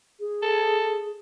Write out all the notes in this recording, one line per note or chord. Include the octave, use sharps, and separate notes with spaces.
G#4
A4